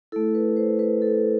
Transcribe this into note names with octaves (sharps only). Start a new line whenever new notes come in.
A3 E4 A4
B4
C5
B4
A4